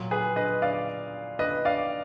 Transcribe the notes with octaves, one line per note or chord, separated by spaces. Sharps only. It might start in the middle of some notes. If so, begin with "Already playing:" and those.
Already playing: A#2 F#3
G#4 B4
B4 D#5
D5 F5
B4 D#5
D5 F5